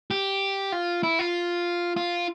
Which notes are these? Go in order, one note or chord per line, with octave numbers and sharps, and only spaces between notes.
G4
F4
E4
F4
F4